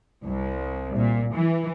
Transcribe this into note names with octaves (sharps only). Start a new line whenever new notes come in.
C2
A#2
E3